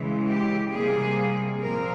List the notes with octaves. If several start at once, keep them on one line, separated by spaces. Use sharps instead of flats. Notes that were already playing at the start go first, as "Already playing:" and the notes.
Already playing: C#3 E3 G#3
G4
C3 G3 A#3 G#4
A#2 F3 C4 A#4